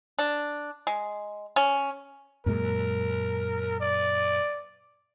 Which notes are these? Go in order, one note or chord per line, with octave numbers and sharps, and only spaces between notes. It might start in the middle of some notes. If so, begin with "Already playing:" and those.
D4
G#3
C#4
F#2 A#2 G#3 A#4
D5